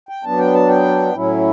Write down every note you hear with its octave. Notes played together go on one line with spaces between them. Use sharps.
G5
F#3 B3 D4 A5
G5
A5
G5
A2 F#3 C#4 E4